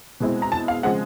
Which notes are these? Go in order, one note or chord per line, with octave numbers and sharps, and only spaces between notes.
B2 G#3 C4 E4
A#5
A5
F5
C#3 F3 G#3 C4 F#5